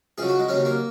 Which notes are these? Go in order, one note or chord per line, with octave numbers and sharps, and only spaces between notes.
C#2 C#3 F#3 G#4
F#4
G#3
D#2 C#3 F#3 C#4
A#3